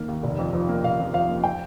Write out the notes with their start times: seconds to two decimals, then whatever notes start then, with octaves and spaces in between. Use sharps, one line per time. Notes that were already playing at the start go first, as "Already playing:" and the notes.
Already playing: D#3 A#3
0.08 D#2
0.23 F1
0.38 F2
0.53 F3
0.69 A#3
0.83 F1 F5
0.99 F2
1.13 F3 F5
1.28 A#3
1.44 G5